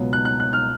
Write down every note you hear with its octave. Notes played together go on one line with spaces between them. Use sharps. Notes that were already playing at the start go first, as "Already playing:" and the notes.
Already playing: C#2 B2 F#3 B3
F#6
F#6
F#6
F6